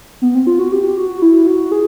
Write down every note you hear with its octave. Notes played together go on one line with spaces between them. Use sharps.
B3
C4
F4
F#4
G4
F#4
E4
F#4
G#4